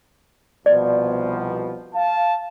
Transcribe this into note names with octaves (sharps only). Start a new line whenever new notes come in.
C2 B2 F3 D5
F5 A5